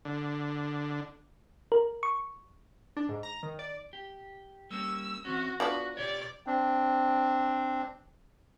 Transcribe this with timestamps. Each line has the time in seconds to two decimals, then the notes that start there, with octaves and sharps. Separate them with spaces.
0.05 D3
1.72 A#4
2.03 C#6
2.97 D4
3.09 G#2
3.23 A#5
3.43 D#3
3.59 D5
3.93 G4
4.71 G3 A#3 C#4 E6
5.25 E3 C4 C#4 F#4
5.60 F3 B3 D4 F#4 B4
5.97 B2 G4 C#5 D5
6.47 C4 D4